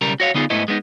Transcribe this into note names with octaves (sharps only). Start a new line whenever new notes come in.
B1 C#3 G3 A#4
F#4 C#5 F5
D3 B3 D#4 F4 G#4
G#2 A3 B3 E4 D#5
G#3 B3 D4 D#4